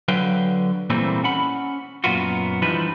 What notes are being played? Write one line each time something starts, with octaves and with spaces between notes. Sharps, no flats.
D3 F#3 B4 F5 G5
A#2 E3 G3 A3 A#3 C4
C#4 F#5 B5
F#2 A#2 B3 F4 F#4
E3 F3 G3 D4 D#4 B4